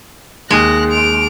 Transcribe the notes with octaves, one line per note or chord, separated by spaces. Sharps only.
D#2 G#3 F#6 A#6
D7 F7